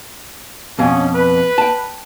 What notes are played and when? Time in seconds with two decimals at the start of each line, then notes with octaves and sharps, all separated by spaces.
0.79 F2 B2 C#4
1.15 B4
1.58 G5 A5